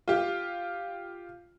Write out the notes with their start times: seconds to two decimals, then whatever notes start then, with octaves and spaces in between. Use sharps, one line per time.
0.08 F4 G4